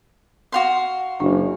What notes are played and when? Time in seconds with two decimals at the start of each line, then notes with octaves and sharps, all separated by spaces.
0.52 F#4 F5 C6
1.20 F#1 D4